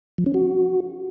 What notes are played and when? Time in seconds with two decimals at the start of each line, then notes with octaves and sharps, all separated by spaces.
0.18 F3
0.26 C#4
0.34 F#4